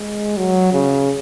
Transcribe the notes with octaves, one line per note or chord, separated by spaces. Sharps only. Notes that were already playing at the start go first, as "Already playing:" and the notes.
Already playing: G#3
F#3
C#3